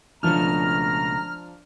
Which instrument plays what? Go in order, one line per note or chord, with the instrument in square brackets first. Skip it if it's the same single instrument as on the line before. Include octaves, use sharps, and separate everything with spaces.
[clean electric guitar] C#2 B2 A3 [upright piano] F3 D4 [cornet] A#5 [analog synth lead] F6